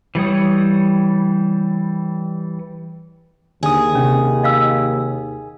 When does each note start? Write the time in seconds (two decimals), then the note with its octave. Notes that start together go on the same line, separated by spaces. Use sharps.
0.15 E3 G3 C#5 D#6
3.63 D#2 D3 G#4 D#6
3.95 C3 C#4
4.43 D#5 F5 E6